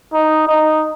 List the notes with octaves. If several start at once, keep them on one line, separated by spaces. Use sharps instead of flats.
D#4
D#4